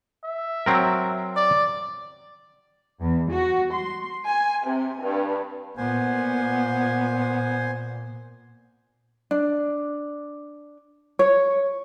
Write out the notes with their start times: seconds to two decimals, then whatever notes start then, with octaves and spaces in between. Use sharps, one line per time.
0.24 E5
0.66 F#3 C4 A#4
1.36 D5
3.01 E2
3.31 F#4
3.73 C6
4.26 G#5
4.67 C3
5.02 G2
5.77 A#2 B3 C5 G#5
9.31 D4
11.19 C#5